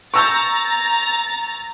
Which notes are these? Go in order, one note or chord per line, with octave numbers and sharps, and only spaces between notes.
A#5 C#6 E6 G6 A6